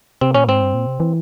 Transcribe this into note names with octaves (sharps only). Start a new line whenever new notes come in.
C3 C4
A#2 C#4
G#2 C4
G2
A#2
C3
E3